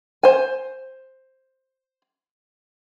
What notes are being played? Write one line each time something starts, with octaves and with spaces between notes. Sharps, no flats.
C5 G#5